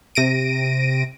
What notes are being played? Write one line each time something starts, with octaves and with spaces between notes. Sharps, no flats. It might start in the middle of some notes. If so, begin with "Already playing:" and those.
C3 A#6 D7 D#7